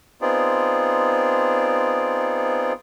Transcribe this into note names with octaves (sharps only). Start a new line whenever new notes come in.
B3 C4 D#4 F4 G#4 D5